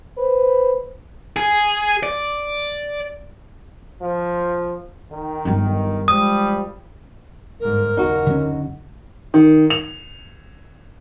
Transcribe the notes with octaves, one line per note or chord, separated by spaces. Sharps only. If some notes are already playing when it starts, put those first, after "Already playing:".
B4 C5
G#4
D5
F3
D#3
G1 F#3
F3 G3 G#3 D#6
G1 G#2 A#4
F#1 D#2 D#4 F#4
D3 F#3 C#4
D#3
F7